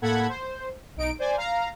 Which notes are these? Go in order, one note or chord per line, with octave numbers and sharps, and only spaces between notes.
A2 A#3 A4 F#5 B5 G#6
C5
B1 D#4 D7
C5 D5 G#5
F5 A#5